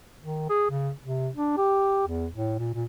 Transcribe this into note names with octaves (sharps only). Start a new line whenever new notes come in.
D#3
G#4
C#3
C3
D4
G4
E2
A2
A#2
A#2